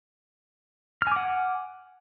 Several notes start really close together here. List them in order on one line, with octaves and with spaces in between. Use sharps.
F6 G#5 D6 F#5